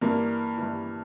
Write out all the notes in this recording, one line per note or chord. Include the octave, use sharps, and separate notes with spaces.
G2 E3 A#3
E3
G2